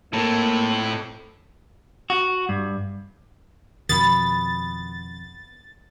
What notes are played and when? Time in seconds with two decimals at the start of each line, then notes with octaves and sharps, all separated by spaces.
0.13 A2 A#3 C4 A4
2.10 F#4
2.49 G2
3.89 F2 B2 D#3 B3 B5 A6